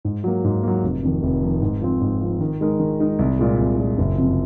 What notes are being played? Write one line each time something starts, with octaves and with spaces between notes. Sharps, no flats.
G#2
F#3 A#3
G#2
F#3 A#3
F1
F2 D#3
F1
F2 D#3
G#2
F3 C4
G#2
F3 C4
D#3
G#3 D#4 A#4
D#3
G#3 D#4 A#4
C2
A#2 G#3
C2
A#2 G#3
F#1
F2 C3